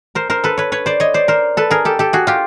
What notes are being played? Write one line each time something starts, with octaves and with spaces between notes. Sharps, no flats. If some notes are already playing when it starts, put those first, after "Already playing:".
A#4 C5
A#4 C5
A4 B4
B4 C#5
B4 C#5
C5 D5
C#5 D#5
C5 D5
A#4 C5
A4 B4
G#4 A#4
G4 A4
G4 A4
F#4 G#4
F4 G4